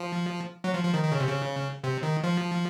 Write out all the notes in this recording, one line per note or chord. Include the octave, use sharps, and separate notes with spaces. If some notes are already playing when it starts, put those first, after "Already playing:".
Already playing: F3
F#3
F3
F3
D#3
D#3
C#3
C3
C#3
C3
D#3
F3